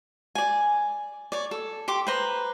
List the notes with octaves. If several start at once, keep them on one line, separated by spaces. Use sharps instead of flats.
D5 G#5
C#5 D5
A4
G4 C6 D6
B4 C5 A#5